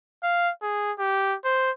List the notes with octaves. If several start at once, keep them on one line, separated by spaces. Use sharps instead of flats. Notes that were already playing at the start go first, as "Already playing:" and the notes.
F5
G#4
G4
C5